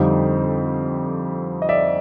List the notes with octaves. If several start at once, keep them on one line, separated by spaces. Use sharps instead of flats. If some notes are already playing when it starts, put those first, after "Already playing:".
Already playing: F2 D3 G3 C4 D#4 D#5 F5
D#5
D5 E5